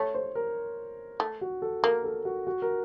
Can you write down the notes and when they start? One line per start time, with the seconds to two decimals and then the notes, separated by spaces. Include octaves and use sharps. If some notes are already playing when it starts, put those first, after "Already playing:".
Already playing: A3 C#5
0.14 C5
0.35 A#4
1.20 A3
1.41 F#4
1.62 A4
1.83 A#3 A#4
2.04 A4
2.25 F#4
2.47 F#4
2.62 A#4